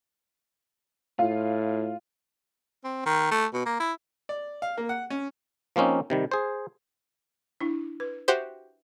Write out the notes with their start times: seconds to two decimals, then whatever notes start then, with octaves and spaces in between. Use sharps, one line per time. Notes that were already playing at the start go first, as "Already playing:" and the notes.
1.19 A2 F4 F5
2.84 C4
3.06 D#3
3.31 A3
3.53 B2
3.66 A#3
3.80 E4
4.29 D5
4.62 F5
4.77 A#3
4.89 F#5
5.10 C#4
5.76 F3 A#3 C4 C#4 D#4
6.10 C3 D#3 G3
6.31 G#4 C5
7.61 D4 E4
8.00 B4
8.28 F#4 G4 C5 E5